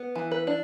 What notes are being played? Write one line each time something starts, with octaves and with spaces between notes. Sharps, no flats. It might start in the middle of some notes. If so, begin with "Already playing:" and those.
Already playing: B3
E3
B4
D4